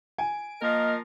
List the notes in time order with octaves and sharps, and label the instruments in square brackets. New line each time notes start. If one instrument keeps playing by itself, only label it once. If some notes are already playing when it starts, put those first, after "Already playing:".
[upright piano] G#5 [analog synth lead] D7
[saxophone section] F3 A#4 [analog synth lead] A#3 [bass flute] D#5